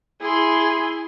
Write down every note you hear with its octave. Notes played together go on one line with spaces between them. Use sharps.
E4 G#4 C6